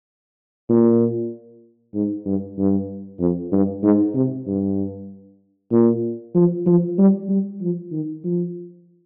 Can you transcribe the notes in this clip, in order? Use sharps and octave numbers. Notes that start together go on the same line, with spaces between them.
A#2
G#2
G2
G2
F2
G2
G#2
C3
G2
A#2
F3
F3
G3
G3
F3
D#3
F3